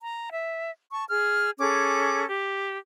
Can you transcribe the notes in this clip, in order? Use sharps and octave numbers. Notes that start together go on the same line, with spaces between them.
A#5
E5
A5 C#6
G#4 F6
C#4 G#4 A4 D6
G4